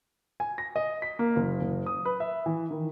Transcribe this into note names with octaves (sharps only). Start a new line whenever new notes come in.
G#5
A#6
D#5
B6
A#3
F#1
F#1
D#6
B4
E5
E3
D#3